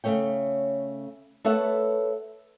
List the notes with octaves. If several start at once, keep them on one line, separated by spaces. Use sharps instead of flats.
C#3 F3 A3 C#5 G5
A3 A4 B4 C#5 E5 F#5